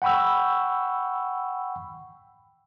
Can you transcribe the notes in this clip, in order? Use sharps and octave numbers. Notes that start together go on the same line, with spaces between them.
F#5 G5 B5 C#6 E6